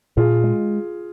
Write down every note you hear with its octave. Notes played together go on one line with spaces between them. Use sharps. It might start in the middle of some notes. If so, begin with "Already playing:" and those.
A#2 F4 G#4
G#3